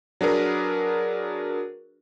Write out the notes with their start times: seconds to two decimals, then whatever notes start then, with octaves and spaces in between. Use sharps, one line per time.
0.21 F#3 D4 G#4 A#4 B4